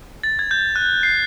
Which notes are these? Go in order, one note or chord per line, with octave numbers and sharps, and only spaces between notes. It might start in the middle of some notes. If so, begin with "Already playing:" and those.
A6
G#6
G6
F#6
C7